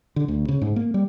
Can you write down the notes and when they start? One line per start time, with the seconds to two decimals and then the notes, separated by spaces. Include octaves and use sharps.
0.16 D3
0.28 D2
0.48 C#3
0.62 G#2
0.76 A#3
0.94 G3